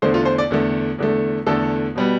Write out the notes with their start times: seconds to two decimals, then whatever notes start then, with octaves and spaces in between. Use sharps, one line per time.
0.02 E2 D3 A3 C5
0.14 F4
0.25 C5
0.38 D5
0.51 E2 D3 A3
0.98 E2 D3 A3
1.46 E2 D3 A3 A4
1.95 B2 G3 B3